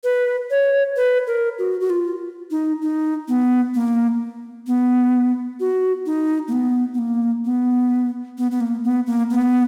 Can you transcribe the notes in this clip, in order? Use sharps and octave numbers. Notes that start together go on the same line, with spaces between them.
B4
C#5
B4
A#4
F#4
F#4
F4
D#4
D#4
B3
A#3
B3
F#4
D#4
A#3
B3
B3
A#3
B3
B3
B3
A#3
B3
A#3
B3